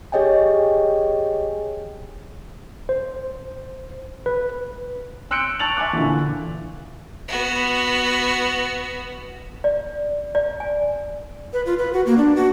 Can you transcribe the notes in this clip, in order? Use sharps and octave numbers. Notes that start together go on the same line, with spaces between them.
G4 G#4 C#5 D#5 G5 G#5
C5
B4
C6 E6 F#6 G6 C#7 D7
A5 C#6 A6 D7 F7 F#7
E5 G#5 C#6 D6 F#6
A#2 D3 E3
B3 F#4
D5
D5
G#5
B4
F4
B4
F#4
A#3
D4
F#4